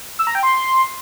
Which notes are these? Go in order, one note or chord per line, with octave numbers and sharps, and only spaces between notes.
E6
A#5
G5
C6